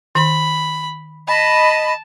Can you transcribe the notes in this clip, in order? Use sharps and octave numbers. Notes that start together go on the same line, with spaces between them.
D#3 B5
D#5 A5 B5